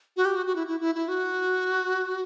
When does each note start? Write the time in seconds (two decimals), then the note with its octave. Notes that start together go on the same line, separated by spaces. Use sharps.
0.17 F#4
0.25 G4
0.36 F#4
0.46 F#4
0.56 E4
0.67 E4
0.80 E4
0.95 E4
1.08 F#4